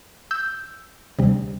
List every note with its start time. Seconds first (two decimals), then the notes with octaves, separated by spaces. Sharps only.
0.31 E6 G6
1.19 D2 C3 G3